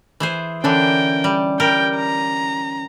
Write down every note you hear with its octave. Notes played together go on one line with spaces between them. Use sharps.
E3 G#4 C5
D3 E3 C#4 D4 A#4 G5
G3
G3 G4 A#4 G5
A#5